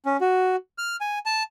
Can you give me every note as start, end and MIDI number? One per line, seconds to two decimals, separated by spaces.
0.06 0.17 61
0.21 0.56 66
0.78 0.96 89
1.01 1.19 80
1.26 1.43 81